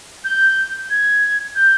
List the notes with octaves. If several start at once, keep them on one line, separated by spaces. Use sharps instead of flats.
G6
G#6
G6